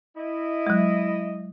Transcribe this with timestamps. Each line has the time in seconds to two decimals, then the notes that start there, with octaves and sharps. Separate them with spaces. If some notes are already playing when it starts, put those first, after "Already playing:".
0.16 E4 D#5
0.67 F#3 G#3